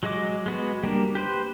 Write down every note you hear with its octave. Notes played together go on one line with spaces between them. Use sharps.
F#3 G#3 F#4 D#5 D6
G#3 B3 F#4
G3 A#3 D4
G4 B4 C5